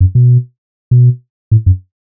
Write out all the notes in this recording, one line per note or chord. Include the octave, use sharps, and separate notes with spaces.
F#2
B2
B2
A2
F#2